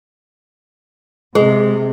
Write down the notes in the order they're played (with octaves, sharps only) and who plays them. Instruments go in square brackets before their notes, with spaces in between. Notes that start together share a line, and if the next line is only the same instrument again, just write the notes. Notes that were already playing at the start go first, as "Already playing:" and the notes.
[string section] C3 [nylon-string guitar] G#3 [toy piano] G#4